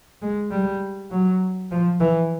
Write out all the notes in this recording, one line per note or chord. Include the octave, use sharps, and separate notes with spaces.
G#3
G3
F#3
F3
E3